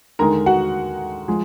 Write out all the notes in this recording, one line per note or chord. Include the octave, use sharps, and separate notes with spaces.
D#2 D3 G#3 D#4 A#4 A#5
F#4 F#5
F3 G#3